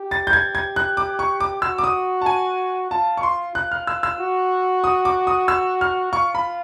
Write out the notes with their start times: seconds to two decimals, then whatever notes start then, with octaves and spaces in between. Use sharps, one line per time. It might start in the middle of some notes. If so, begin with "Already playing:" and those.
Already playing: G4
0.11 A6
0.27 G6
0.33 G4 G#6
0.55 G#6
0.76 F#6
0.97 D6
1.19 C#6
1.40 D6
1.62 F#4 E6
1.78 D6
1.84 D#6
2.21 A5
2.26 G#5
2.91 F4 A5
3.17 C#6
3.23 C6
3.55 F4 F#6
3.71 F6
3.87 E6
4.03 E6
4.19 F#4
4.84 D#6
5.05 D6
5.27 D#6
5.48 E6
5.81 F6
6.12 F4 C#6
6.35 B5